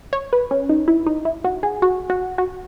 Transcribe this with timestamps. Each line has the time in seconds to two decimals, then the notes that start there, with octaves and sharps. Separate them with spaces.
0.13 C#5
0.33 B4
0.51 C#4
0.69 D#4
0.88 E4
1.06 D#4
1.25 E4
1.44 F#4
1.63 G#4
1.82 F#4
2.10 F#4
2.38 F#4